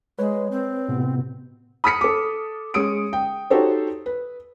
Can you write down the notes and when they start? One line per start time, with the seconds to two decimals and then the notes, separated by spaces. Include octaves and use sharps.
0.19 G#3 B4 C#5
0.51 C4
0.89 A2 C3 B3
1.84 B5 D#6 F6 B6 C#7
2.01 A4 D6
2.74 G#3 C#4 D#6 C#7 D7
3.13 G5
3.50 D#4 F#4 G4 A4 C5 C#5
4.06 B4